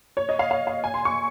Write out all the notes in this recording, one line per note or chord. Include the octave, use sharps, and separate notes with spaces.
C#5
D#5
F5
F5
F5
G#5
C6
C#6